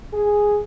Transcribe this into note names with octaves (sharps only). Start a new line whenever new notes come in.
G#4